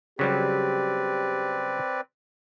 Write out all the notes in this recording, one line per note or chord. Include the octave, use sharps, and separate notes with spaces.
C#3 F#3 G3 C4 G4 B4 D5